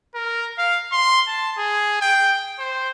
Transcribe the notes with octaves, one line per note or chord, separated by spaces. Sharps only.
A#4
F5
C6
A5
G#4
G5
C5